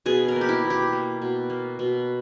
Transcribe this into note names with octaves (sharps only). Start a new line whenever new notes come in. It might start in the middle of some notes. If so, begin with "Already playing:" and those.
B2 G#4
A#4
A#3
G4
E4
B2
G4
A#3
B2
A#3
B2